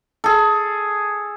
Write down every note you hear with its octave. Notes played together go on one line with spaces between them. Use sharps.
G#4 A4